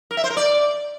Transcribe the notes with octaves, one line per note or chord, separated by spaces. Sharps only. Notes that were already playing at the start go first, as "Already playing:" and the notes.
A#4
E5
C5
A#4
D5